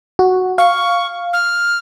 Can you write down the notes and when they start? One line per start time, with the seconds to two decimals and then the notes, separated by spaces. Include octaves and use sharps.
0.19 F#4
0.58 F5 C#6
1.33 F6